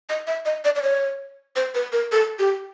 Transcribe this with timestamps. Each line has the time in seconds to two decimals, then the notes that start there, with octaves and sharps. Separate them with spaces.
0.09 D#5
0.27 E5
0.45 D#5
0.65 D5
0.76 D5
0.83 C#5
1.56 C5
1.75 B4
1.92 A#4
2.12 A4
2.39 G4